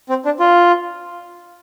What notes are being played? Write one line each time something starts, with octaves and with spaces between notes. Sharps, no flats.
C4
D4
F4